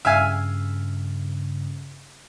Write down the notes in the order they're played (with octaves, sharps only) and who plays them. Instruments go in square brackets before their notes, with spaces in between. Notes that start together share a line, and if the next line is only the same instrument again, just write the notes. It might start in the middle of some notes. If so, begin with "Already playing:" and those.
[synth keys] G2 C#3 [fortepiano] E5 F5 G#5